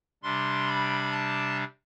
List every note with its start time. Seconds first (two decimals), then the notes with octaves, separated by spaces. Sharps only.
0.23 C3 G3 D4 C6
0.68 B5
1.11 A5